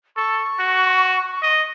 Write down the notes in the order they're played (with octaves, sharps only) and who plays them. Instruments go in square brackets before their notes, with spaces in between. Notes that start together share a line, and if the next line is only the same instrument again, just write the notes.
[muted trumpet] A4 [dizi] C#6
[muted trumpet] F#4
D#5